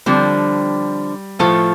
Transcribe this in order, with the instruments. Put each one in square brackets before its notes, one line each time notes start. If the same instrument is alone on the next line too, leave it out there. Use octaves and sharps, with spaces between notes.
[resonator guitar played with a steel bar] D3 F3 C4 [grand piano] G3
[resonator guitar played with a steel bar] A2 A3 F4 A4 [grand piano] F3